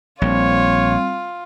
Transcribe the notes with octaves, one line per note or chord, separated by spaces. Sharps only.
A#1 G3 C4 F4 C#5